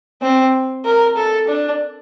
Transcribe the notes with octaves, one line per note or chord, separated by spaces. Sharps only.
C4
A#4
A4
D4